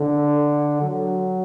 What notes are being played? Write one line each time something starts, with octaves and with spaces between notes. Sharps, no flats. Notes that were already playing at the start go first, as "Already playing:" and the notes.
Already playing: D3
F#3